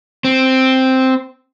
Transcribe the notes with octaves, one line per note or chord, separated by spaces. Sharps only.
C4